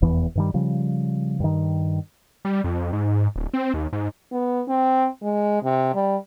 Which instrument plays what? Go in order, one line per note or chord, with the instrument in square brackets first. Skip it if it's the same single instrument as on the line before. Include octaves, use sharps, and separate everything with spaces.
[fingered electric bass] F1 E2 E3 B3
G2 D#3 G3
C#3 F3 G3
G2 D#3
[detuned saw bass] G3
F2
G#2
D1
C4
D#2
G#2
[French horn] B3
C4
G#3
C3
G3